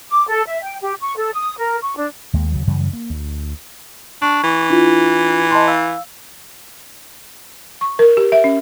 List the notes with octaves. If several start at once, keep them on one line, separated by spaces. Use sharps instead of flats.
D6
A4
E5
G5
G4
C#6
A4
D#6
A#4
C#6
D4
D#2 G#3 A#3
D#2 C#3 F#3
F#2 C#3 E3 G3
A#3
D2
D4 C#6
E3
D4 E4 F4
D#5 A5 C6
F5 E6
C#6
A#4
G4
E5
C#4